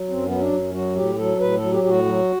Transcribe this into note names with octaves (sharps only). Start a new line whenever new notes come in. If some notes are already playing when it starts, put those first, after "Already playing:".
Already playing: F#3
F#2 C4
B3
F#3
D4
F#2
F#3 F#4
A2 G4
F#3 A4
A2 B4
A4
F#3
G4
A2 F#4 G4
F#3